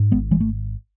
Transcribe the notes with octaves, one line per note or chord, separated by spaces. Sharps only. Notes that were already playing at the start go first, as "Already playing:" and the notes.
Already playing: G#2
G#1 G#3 B3
E3 G#3
A3